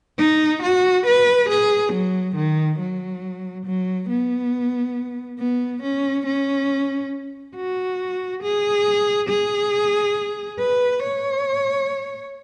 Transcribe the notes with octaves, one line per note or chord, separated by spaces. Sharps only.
D#4
F#4
B4
G#4
F#3
D#3
F#3
F#3
B3
B3
C#4
C#4
F#4
G#4
G#4
B4
C#5